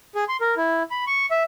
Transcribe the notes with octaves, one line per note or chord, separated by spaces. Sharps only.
G#4
C6
A#4
E4
B5
C#6
E5